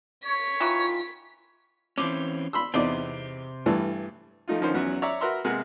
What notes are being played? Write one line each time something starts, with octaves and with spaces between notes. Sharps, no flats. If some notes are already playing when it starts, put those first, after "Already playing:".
C#5 B6
D#3 E3 F4
E3 C4 C#4 D6
B5 C6 E6
E2 C3 C4 D#4 D5
G2 E3 A3
F3 A3 D#4 F4
D3 D#3 F3 C#4 D#4 C5
E2 F#3 B3 C#4
C#5 D5 E5 A#5
F#4 A#4 B4 E5 A#5 C6
C3 G#3 A#3 B3 A#4